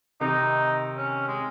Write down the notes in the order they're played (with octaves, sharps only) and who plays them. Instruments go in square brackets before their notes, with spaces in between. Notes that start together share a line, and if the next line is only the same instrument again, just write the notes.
[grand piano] C3 D#3 [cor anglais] D#4
[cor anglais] C#4
G#3